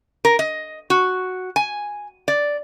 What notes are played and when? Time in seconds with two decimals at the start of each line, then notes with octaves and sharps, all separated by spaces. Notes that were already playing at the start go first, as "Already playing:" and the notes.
0.25 A#4
0.39 D#5
0.90 F#4
1.56 G#5
2.28 D5